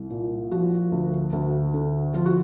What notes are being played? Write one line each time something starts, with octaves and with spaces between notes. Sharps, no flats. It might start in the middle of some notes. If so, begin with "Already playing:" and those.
Already playing: C2
A#2
F3 F#4
D2
D2
D3
F3 F4
F#4